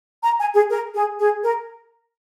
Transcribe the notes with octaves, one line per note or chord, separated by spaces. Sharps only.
A#5
G#5
G#4
A#4
G#4
G#4
A#4